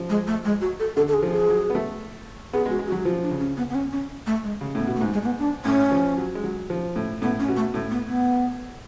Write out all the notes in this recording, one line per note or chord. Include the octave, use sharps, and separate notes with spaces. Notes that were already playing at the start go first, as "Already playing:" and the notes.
Already playing: F3
G#3
A3
G#3
F#4
A4
D3 A4
A4
G#4
F3
G#4
F#3
B3
A3
B3 G#4
G#3
F#4
G#3
F#4
F#3
F3 F4
D4
C#3
C#4
B3
B3
C#4
C#4
A3
G#3
C#3
A2 B3
B2
A3
G#2
G#3
A3
B3
D4
A2 C#4
F3
F#3
G#3
F#3
F3
A2
A2 B3
C#4
B2
A3
A2 A3
B3
B3